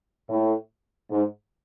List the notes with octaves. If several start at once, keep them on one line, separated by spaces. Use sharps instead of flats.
A2
G#2